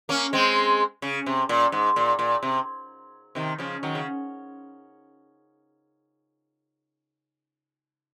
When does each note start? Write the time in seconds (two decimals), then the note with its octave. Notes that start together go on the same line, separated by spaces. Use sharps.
0.09 A#3 C#4
0.33 G#3 C4
1.02 C#3
1.26 C3
1.49 A#2
1.72 G#2
1.96 A#2
2.19 A#2
2.43 C3
3.35 C3 D#3
3.58 C#3 F3
3.83 D#3 F#3
3.95 C#3